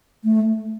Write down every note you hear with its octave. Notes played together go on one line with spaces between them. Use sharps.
A3